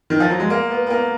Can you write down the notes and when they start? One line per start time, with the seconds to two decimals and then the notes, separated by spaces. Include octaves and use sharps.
0.10 D#3
0.20 F3
0.30 F#3
0.40 G#3
0.50 A#3
0.70 B3
0.86 B3
0.90 A#3